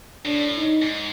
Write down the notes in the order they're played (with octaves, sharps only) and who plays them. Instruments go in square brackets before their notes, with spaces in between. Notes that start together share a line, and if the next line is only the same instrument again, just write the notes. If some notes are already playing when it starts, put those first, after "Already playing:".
[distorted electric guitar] A2 [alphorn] D4
[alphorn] D#4
[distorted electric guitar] G#2